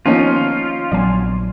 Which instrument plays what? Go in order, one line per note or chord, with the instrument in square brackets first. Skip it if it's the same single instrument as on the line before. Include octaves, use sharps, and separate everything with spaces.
[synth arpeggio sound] D#3 A#3 B3 [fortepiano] F3 C#4 D#4 [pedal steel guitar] F4
[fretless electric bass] A#1 F#3 B3 [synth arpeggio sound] D5 G#5